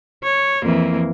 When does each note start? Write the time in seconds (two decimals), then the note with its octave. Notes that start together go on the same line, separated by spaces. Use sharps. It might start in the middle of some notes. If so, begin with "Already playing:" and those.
0.23 C#5
0.64 F2 E3 A#3